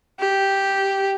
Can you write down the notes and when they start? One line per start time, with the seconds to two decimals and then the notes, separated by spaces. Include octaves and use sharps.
0.20 G4